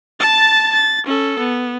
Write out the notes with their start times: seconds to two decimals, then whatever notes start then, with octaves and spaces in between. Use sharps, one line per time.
0.20 A5 A6
0.73 A6
1.07 C#4 A4
1.39 B3